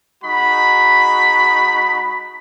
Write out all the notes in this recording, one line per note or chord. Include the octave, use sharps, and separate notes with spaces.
G#3 D#4 F#4 B5